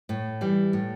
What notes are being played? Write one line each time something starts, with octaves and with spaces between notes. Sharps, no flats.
A2
E3 G3
A2